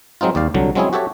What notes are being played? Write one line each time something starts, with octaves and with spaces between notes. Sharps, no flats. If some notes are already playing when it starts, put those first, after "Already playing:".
F#3 G#3 C4 D#4 F4
D#2 G4 D5 F5
C2 D3 F#3
F#3 G#3 C4 C#4 E4 G#4
F#4 G4 A4 C#5 E5